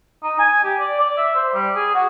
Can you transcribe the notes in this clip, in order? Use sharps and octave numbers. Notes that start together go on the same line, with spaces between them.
D#4
G#5
G4
D5
D5
E5
C5
G3
G#4
F#4